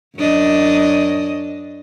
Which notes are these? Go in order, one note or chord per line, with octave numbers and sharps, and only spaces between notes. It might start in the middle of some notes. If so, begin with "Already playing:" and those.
F#2 D4 D#5